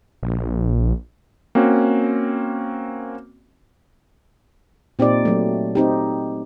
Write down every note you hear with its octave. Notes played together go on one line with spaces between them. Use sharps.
A#1
A#3 C4 C#4 F#4
A#2 C4 D#4 G4 D5
F#3 A3
C4 D#4 G4